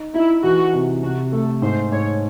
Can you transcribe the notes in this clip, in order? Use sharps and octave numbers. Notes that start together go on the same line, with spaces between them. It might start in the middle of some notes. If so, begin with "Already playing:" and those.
Already playing: D#4
D#4 E4
E3 F#4
C3
C3 F#4
A3 A4
G#2 C5
G#2 C#5